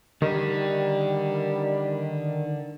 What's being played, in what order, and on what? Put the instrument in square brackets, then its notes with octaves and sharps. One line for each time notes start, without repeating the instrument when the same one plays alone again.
[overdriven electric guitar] D3 [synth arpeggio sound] D#3 [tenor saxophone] G3